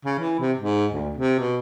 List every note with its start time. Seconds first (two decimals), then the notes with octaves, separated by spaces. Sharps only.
0.05 C#3
0.19 E3
0.40 C3
0.58 G#2
0.92 D2
1.17 C3
1.39 B2